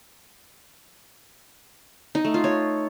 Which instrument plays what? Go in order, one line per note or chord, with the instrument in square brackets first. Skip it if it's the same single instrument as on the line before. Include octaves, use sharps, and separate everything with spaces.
[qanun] D#4
A3
F4
C#5